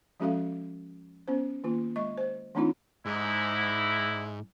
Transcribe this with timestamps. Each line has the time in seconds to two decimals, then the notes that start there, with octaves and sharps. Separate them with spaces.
0.20 F3 G#3 C#4 F#4 A4 F5
1.28 B3 C#4 C5
1.64 D#3 A#3 F4
1.96 G#3 D#5 C#6
2.18 C5
2.55 E3 A3 C4 D4 D#4 F4
3.05 G#2 D3 D#4 E4